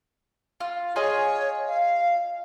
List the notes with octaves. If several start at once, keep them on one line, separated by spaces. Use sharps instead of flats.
F4
F4 G#4 C#5 D#5
F5